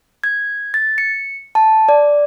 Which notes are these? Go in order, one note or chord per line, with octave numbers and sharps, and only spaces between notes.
G#6
A6
C#7
A5
D5